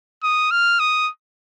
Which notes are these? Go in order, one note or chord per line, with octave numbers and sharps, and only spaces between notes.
D#6
F6
D#6